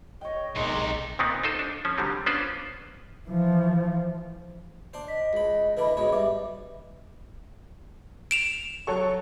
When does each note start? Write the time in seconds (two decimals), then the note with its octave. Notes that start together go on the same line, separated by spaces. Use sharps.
0.21 C#5 D#5 G5
0.56 B1 C3 D#3 G#3 D#4 D5
1.19 A#2 D#3 B3 C4 D#4
1.43 D#4 F4 A4 C5 D#5
1.59 D4
1.85 F3 C#4
1.98 D3 F#3 G3 C4
2.26 B3 C#4 D4 F4 B4 C5
3.28 E3 F3
4.94 D4 C5
5.08 D#5 B6
5.33 C#2 B5
5.77 D3 E3 D4 B4 B5
5.97 G#2 B2 C#5
6.12 G3 B4 E5 D6
8.31 D7 E7 F7
8.87 F#3 A4 C#6